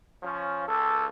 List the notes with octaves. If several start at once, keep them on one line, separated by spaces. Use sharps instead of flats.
F3 C#4
C#2 A4